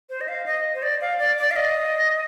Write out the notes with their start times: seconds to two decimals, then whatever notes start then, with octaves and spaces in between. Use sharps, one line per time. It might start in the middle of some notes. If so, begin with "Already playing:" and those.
0.10 C5
0.21 D#5
0.28 F5
0.46 D#5
0.75 C5
0.83 D5
1.01 F5
1.19 D5
1.38 D5
1.51 F5
1.56 D#5